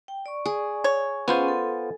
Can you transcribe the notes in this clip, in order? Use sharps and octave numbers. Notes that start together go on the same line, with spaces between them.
G5
D5 C#6
G#4
C#5
B3 C#4 F4 G#4 C5 G#5
A4